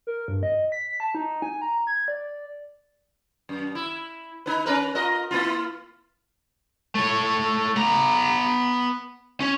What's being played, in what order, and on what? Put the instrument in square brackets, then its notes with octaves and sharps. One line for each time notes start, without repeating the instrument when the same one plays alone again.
[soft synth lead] A#4
G2
D#5
B6
A5
D#4
G#5
A#5
G#6
D5
[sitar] F#2
E4
D#4 B4
C#4 A#4 B4
F4 A#4 D#5
A#3 E4 F4
[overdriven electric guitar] A3 C#5
B3 A#5
C#4